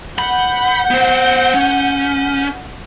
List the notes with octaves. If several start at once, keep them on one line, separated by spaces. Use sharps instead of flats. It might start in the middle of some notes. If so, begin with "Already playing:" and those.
F#5 B5 G6
B3 C5
C#4